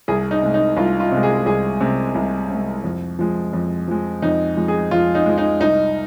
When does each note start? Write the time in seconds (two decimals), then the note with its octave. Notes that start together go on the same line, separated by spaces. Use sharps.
0.08 C2 G#4
0.31 D#4
0.42 C3 G#3
0.54 D#4
0.77 C2 F4
1.00 F4
1.12 C3 G#3
1.23 G#4
1.46 C2 G#4
1.81 C3 G#3
2.15 C2
2.50 C3 G#3
2.84 F2
3.19 F3 G#3
3.53 F2
3.88 F3 G#3
4.22 F2 D#4
4.57 F3 G#3
4.68 G#4
4.91 F2 F4
5.15 D#4
5.26 F3 G#3
5.38 D#4
5.60 C2 D#4